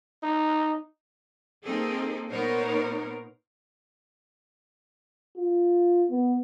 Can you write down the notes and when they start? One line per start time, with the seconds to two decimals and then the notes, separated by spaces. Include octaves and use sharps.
0.23 D#4
1.63 A#3 C4 D#4 G#4 A4
2.30 A#2 B3 D#4 A#4 C5 C#5
5.37 F4
6.11 B3